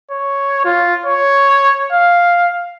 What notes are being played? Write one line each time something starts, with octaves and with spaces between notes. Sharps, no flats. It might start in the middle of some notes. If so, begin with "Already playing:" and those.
C#5
F4
C#5
F5